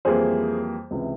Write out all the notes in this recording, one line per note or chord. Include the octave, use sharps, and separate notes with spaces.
F2 E3 G3 A#3 G#4 C5
C#2 C3 E3